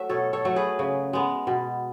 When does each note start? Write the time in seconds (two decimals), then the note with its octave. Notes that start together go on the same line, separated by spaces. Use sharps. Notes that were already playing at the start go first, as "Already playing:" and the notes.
Already playing: F#3 A3 F#4 E5
0.09 B2 A4 C#5
0.33 A4 C#5
0.45 F#3 A3
0.56 G#4 B4
0.79 C#3
1.13 G#3 B3
1.47 B2